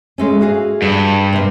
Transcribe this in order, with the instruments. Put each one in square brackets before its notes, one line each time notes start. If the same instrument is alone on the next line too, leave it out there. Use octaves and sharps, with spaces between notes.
[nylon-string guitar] G#3 A3 C#4
F#4 G#4 F5
[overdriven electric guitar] G2
[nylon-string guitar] C3 A#3